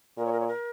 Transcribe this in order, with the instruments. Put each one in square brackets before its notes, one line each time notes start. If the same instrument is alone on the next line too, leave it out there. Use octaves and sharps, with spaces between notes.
[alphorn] A#2 [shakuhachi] A#4
[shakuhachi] C#5
A#4
C#5
A#4